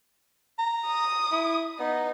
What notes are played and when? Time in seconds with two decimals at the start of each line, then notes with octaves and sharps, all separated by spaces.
0.59 A#5
0.87 D#6
1.32 E4
1.79 B3 D#4